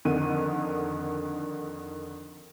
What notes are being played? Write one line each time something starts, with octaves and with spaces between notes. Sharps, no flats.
F2 D3 D#3 D#7